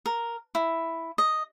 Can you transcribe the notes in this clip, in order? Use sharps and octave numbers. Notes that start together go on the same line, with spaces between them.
A#4
E4
D#5